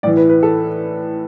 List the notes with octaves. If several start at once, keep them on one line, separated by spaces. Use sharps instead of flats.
A2 E3 D5
B4
B4
A4